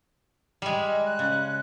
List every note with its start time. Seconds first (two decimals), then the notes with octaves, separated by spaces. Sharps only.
0.62 G3 G#3
0.86 D#5
1.06 F#6
1.19 C#3